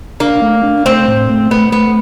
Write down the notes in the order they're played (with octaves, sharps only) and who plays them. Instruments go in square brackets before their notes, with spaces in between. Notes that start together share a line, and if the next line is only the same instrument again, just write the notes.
[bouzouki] A#3 [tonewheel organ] D4
[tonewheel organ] A3
D4
[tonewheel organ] A3 [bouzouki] C4
[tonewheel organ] A2
A3
[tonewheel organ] A3 [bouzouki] B3
[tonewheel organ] A3 [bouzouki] B3